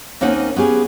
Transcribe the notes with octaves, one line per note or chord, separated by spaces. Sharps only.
D#2 A#3 C4 C#4 D#4 F#5
B3 C#4 G4 G#4